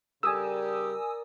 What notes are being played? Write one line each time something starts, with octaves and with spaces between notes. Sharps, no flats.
C#3 G3 G4 A#4 D5 G#5 D#6 E6